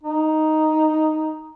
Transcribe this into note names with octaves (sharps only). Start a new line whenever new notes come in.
D#4